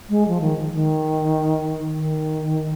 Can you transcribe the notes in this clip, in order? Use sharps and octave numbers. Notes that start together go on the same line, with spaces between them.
G#3
F3
D#3
D#3
D#3